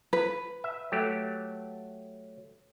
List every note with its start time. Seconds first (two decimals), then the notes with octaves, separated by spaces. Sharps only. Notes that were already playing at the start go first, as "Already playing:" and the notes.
0.13 B4
0.64 E5
0.92 F#3 A3 G4